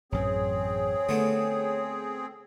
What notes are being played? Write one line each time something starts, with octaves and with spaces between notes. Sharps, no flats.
A1 F#2 E3 C4 G#4 C#5
D3 A3 B3 D4